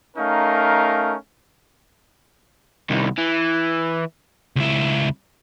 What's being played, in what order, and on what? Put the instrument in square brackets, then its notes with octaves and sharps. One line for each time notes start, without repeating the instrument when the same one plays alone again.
[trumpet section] A3 C#4 D#4 A#4 F5
[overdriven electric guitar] C2 D#3
E3
[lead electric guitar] C#2 E4